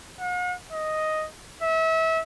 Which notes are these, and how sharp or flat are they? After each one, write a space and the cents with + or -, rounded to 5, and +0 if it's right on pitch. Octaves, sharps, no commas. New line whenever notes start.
F#5 -45
D#5 +0
E5 -30